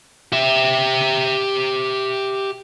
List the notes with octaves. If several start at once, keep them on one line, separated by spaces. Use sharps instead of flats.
G4 E5